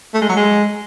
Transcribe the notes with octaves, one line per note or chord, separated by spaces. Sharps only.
A3
G#3
F#3
G#3